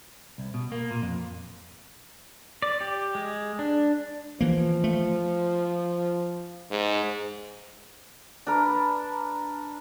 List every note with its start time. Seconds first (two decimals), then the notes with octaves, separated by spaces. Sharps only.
0.38 C2
0.54 B2
0.72 A#3
0.91 A#2
1.02 F2
2.62 D5
2.81 G4
3.15 G#3
3.59 D4
4.41 E3 F3 A#3
4.84 A3
6.71 G#2
8.47 D4 A#4 B4